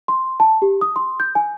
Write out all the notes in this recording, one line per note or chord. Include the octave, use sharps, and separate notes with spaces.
C6
A5
G4
D#6
C6
G6
G#5